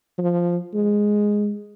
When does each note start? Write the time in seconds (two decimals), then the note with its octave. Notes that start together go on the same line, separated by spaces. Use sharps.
0.19 F3
0.74 G#3